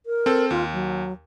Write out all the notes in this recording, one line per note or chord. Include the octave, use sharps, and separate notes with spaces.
A#4
C4 A4
D#2 F4
F#3